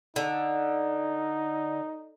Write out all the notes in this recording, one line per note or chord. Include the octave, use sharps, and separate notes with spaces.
D3 D#4